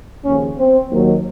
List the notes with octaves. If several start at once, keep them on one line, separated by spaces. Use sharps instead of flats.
D#2 C#3 F3 C#4
C4
D#2 D#3 F#3